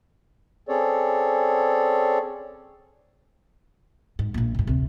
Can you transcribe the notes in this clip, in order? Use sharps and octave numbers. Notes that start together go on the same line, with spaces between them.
C4 C#4 G#4 A4 C#5 D5
G#2
A#1 A#2
F#1 G#2
D2 C3